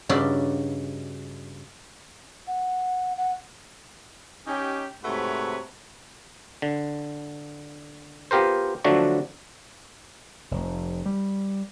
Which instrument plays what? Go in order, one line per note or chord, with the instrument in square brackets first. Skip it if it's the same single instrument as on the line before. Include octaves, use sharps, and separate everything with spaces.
[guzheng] G2 C#3 D#4 F#4 D5 E5
[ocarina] F#5
F#5
[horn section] C#4 D#4 G4
G#2 C3 A3 F#4 B4 C#5
[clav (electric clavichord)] D3
B3 F4 G4 A#4 C5
D3 F3 F#3 A3 D4 F#4
[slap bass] F1
G3